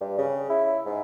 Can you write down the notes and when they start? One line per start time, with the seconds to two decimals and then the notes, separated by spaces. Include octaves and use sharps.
0.01 G2
0.18 C#3
0.50 E4
0.86 G#2